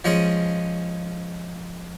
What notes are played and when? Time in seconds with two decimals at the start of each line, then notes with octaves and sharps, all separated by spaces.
0.04 F3 G#3 C#4 G#4